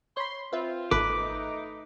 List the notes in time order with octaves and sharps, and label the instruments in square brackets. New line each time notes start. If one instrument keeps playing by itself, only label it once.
[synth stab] C#5 B5 [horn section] C6
[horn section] C4 F4 [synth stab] B4 E5
[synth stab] G#1 A4 B5 [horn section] A3 D#4 [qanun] B4 [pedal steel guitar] D6